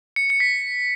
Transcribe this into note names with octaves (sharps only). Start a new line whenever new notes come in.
C#7
C#7
B6